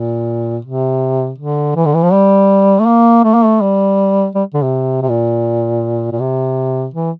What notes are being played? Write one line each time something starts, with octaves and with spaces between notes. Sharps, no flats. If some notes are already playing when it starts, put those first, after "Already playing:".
Already playing: A#2
C3
D3
E3
D3
E3
F3
G3
A3
A#3
A3
A#3
A3
G3
G3
D3
C3
C3
A#2
A#2
C3
E3